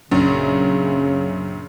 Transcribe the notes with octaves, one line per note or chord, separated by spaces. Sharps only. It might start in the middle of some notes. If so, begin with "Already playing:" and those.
A#1 F#2 C#3